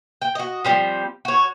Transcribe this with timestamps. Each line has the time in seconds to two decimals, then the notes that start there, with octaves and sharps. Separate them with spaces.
0.22 G5
0.35 F#4 D#5
0.64 F3 G3 C4
1.25 F#4 C#5